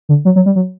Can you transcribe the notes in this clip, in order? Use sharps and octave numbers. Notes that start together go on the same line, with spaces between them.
D3
F#3
F#3
G3
F#3